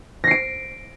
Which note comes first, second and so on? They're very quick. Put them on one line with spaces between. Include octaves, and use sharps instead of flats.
A#6 C7 D7